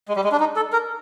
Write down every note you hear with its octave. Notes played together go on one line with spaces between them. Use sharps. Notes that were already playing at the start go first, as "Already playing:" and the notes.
G#3
G3
G#3
D4
D#4
A4
A#4